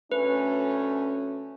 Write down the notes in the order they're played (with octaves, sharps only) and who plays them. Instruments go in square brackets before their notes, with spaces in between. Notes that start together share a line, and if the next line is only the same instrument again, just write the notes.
[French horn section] D2 A3 C#4 [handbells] B4